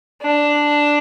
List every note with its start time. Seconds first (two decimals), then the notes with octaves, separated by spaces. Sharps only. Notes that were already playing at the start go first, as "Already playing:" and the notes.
0.22 D4